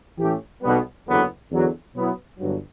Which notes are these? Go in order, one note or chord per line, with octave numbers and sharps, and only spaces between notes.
A2 E3 A3 C#4 G4
B1 B2 G3 B3
F#1 E2 D3 F#3 B3
E2 D3 F#3
B2 F#3 B3 E4
G1 G2 F#3